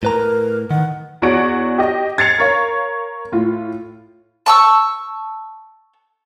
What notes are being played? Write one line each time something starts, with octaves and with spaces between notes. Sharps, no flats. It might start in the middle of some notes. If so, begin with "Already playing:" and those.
A2 A#4 B4 A#5
D#3 F#5
E2 F#4 C#5 D5 F#5 D7
G4 D#5
G#6 A6 C7 C#7 F7
A#4 C#5 F5
A2 F4
A5 C#6 E6